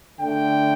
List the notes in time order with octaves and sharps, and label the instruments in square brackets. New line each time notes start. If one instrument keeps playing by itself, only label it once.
[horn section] D3 A3 G5